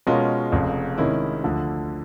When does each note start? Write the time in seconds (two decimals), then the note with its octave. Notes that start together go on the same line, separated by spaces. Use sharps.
0.07 B2 G#3 C#4 F4 A#4
0.52 F1 F2 C#3
0.98 C3 D#3 G#3 C#4 E4
1.44 D2 D3 F3